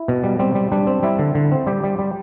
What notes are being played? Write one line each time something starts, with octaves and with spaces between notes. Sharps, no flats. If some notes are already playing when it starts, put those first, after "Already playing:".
Already playing: E4
B2
G3
G3 C4
G3
G3 D4
C4
G3 E4
D3
D3
C4
G3 G4
G3
G3